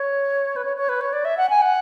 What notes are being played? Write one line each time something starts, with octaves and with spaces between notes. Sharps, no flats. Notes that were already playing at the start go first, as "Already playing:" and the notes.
Already playing: C#5
B4
C#5
C#5
B4
C#5
D5
E5
F#5
G#5
F#5